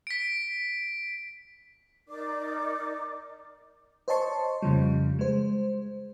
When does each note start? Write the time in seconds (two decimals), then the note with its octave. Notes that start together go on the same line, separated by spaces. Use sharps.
0.07 B6 D7
2.08 D#4 A#4 D5 D6
4.08 C5 C#5 D#5 A5 C6 C#6
4.62 F2 C#3 F3 G3
5.19 G#3 C5